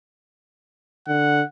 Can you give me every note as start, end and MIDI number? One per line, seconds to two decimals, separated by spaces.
1.08 1.42 50
1.08 1.46 78